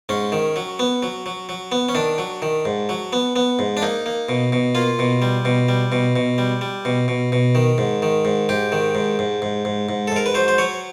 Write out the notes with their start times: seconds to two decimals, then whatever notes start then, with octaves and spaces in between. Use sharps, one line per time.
0.09 G#2 C#4
0.32 D#3
0.56 F#3
0.79 B3
1.03 F#3
1.26 F#3
1.49 F#3
1.72 B3
1.89 C#4
1.95 D#3 D4
2.18 F#3
2.42 D#3
2.65 G#2
2.89 F#3
3.13 B3
3.36 B3
3.59 G#2
3.77 D4
3.82 A#3 D#4
4.06 A#3
4.29 B2
4.53 B2
4.75 A#3 F4
4.99 B2
5.22 G3
5.45 B2
5.69 G3
5.92 B2
6.16 B2
6.38 G3
6.61 G3
6.85 B2
7.08 B2
7.32 B2
7.55 D#3
7.78 G#2
8.02 D#3
8.25 G#2
8.49 G#2 G4
8.72 D#3
8.95 G#2
9.19 G#2
9.42 G#2
9.65 G#2
9.89 G#2
10.07 A4
10.12 G#2 A#4
10.26 B4
10.34 F#3 C5
10.48 C5
10.58 F#3 C#5